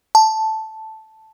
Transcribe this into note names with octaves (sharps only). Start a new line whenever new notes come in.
A5